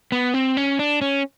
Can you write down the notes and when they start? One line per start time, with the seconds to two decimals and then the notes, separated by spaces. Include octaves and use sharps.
0.12 B3
0.34 C4
0.57 C#4
0.79 D4
1.01 C#4